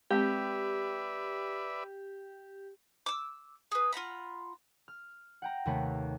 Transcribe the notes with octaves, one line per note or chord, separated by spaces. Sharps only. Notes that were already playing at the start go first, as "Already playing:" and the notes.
G#3 C4 G4 B4 D5 E5
D6 E6
G#4 B4
F4 F#5 A#5 B5
F6
F#5 G5 A#5
D#2 C3 A3 B4 C#5